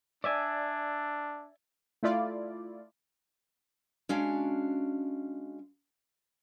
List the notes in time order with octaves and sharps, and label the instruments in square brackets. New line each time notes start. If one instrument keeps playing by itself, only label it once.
[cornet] D4 [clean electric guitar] D5 E5 G#5
[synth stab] A3 E4 F4 D5
[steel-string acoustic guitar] G#3 C#4 D4 F#4 F5